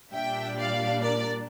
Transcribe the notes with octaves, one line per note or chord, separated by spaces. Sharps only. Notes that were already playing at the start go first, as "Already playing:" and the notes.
A#2 G3 D4 E5 G5
D5 F5
A#4 D5